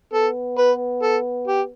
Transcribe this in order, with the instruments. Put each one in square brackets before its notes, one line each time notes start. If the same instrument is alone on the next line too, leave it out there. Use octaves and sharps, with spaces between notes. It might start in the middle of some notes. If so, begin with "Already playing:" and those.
[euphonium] B3 [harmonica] A4
[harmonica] B4
A4
G4